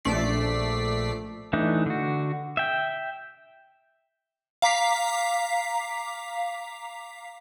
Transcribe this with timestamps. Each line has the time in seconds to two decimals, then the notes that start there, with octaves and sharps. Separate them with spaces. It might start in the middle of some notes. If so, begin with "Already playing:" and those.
0.05 A#1 A3 D5 B6 C7
1.53 E3 A3 D4 D#4
1.86 D3 F#4
2.57 E5 G5
4.62 F5 A#5 D6 B6 C7